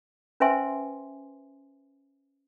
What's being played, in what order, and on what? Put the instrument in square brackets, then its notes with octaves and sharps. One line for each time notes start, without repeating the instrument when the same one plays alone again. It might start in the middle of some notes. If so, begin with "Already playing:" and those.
[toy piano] C#4 B4 C5 E5 G#5 C6